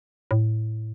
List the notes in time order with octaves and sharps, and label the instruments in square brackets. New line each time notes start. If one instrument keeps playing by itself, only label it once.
[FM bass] A2